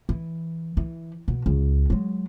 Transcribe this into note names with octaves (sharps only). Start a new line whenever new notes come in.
E3
E3
B2
C#2
F#3 G#3